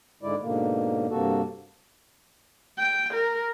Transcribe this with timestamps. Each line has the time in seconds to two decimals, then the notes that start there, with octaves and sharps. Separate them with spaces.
0.23 G#2 D3 G#3 E4 D5
0.42 G#2 B2 D3 A#3
1.10 G2 C3 A#3 F#4 A4
2.78 G5
3.14 A#4